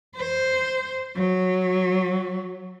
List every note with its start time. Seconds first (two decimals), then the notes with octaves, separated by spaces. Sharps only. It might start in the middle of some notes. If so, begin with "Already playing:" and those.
0.16 C5
1.16 F#3